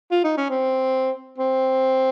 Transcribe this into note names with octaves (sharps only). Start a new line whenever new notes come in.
F4
D#4
C#4
C4
C4